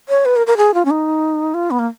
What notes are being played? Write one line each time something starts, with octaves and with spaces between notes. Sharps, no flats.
C#5
B4
A#4
A#4
G#4
F4
C#4
D#4
F4
B3
A#3